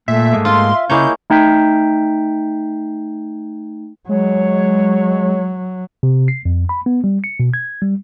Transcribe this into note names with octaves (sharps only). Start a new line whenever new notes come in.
A#2 A3 E5
G#2 G#3 A#3
F4 C6
E5
C#3 G#3 A#3 E4 C#5 G6
A3 D#4 G5 G6 B6
F#3 G#3 C#5
C3
C7
F2
B5
B3
G3
C#7
B2
G#6
G3